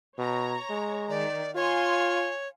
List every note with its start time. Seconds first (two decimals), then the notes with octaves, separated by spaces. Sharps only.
0.18 B2 C#5 A#5
0.70 G#3
1.10 D#3 D5
1.55 F4 C#5 F5 G#5 C6